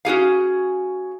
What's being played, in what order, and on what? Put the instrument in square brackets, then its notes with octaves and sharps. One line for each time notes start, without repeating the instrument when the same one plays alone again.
[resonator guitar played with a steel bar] C#4 F#4 G#4 F5